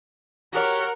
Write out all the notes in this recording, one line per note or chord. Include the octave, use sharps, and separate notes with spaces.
F#4 G4 A#4 C#5 F#5